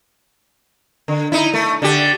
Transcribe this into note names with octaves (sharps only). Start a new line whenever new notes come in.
D3
D#4 E4
A3
D3 G4